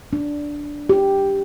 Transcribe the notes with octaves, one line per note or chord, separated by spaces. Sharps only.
D4
G4